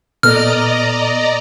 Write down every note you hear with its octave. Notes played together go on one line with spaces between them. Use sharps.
A#2 B3 A4 D5 D#5 A#5 F6